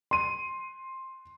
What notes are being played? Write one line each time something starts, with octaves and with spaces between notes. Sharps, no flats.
C6 D#7